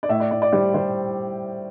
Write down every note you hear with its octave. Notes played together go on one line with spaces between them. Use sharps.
D5
A2 E5
D5
A2 D5
D5
G3 C5
G3 C5